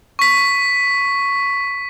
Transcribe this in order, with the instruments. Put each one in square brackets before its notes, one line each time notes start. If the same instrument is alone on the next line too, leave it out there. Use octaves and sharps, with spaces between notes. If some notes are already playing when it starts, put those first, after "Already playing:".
[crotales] C#6 B6